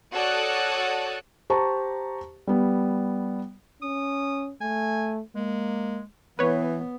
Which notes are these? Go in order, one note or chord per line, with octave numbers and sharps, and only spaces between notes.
F#4 A4 C#5 D5 D#6 F#6
G4 C5 A5 A#5 C#6
G3 B3
C#4 D#6
A3 G#5
G#3 A#3
E3 B3 B4 C#5